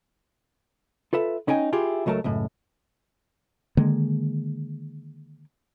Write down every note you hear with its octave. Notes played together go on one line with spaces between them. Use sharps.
F4 A4 B4 E5
B3 C#4 D#4 G5 G#5
E4 F4 G4 G#4
C#2 F#3 A3 A#4 A5
C#2 F#2 A2
D3 D#3 G#3 A#3